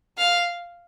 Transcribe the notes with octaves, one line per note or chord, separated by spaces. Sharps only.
F5